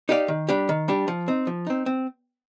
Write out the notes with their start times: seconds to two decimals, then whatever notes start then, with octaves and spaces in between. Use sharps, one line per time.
0.09 D#4 G4 D5 F5
0.28 D#3
0.49 G3 D4 G4
0.69 D#3
0.88 G3 D4 G4
1.08 F3
1.28 C4 D#4
1.47 F3
1.67 C4 D#4
1.86 C4